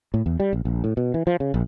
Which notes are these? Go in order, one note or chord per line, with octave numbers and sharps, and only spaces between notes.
A2
E2
G3
A#1
A#1
A2
B2
E3
F3
C#3
A#1